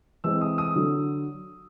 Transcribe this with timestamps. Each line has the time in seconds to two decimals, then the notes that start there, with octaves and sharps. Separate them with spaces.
0.24 E3 G#3 C4 E6
0.41 D#6
0.58 D#6
0.76 D3 F#3